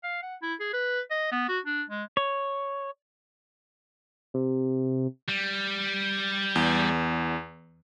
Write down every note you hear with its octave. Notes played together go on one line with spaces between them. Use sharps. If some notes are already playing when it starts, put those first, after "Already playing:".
F5
F#5
E4
G#4
B4
D#5
B3
F#4
D4
G#3
C#5
C3
G3
E2